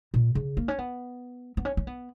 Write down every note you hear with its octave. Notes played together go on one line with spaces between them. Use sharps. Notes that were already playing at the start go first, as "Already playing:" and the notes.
A#2
C#3
A#3
C#4
B3
B3
C#4
C#4
B3